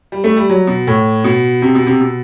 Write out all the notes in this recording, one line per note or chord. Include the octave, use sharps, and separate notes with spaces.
G3
A3
G3
F#3
B2
A2
B2
C3
B2
C3
B2